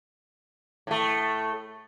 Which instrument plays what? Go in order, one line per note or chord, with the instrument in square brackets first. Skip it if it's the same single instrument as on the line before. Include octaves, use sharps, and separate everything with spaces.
[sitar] A2 A3